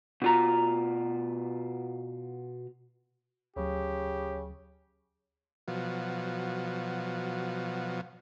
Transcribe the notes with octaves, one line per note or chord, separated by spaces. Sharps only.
B2 F4 A#5
D2 C#3 F#3 G4
B2 F3 F#3